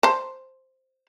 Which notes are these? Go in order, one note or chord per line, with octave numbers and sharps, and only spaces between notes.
C5 A5